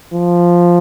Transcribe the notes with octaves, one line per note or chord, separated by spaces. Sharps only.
F3